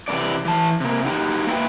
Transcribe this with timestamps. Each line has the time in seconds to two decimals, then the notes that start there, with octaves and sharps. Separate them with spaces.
0.08 C3 E3 B3 D#4 D5
0.45 E3 A5
0.80 C3 A#3
1.05 F#3 D#4 G4
1.47 A#3 C4 E4 B4 E5 G5